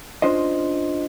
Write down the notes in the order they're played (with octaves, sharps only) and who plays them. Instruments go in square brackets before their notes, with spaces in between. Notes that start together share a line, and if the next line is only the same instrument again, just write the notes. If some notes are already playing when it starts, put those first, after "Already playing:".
[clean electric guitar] C#4 D4 F4 C5 D#5